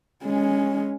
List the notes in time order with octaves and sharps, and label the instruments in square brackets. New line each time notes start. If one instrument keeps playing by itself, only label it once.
[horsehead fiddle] G#3 C#4